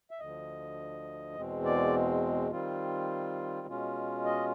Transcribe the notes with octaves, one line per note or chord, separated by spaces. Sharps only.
E5
D2 D3 F3 D#5
E2 B2 G#3 C4
D5
D#3 G3 C4 F4
B2 G#3 C#4 F4
D#5